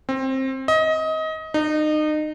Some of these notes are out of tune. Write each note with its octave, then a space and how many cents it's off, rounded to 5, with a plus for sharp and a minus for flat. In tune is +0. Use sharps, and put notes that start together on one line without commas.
C4 +20
D#5 +25
D#4 -30